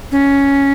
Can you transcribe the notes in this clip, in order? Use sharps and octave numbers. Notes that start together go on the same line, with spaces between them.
C#4